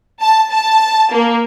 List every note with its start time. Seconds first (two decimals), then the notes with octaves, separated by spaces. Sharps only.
0.21 A5
0.49 A5
1.11 A#3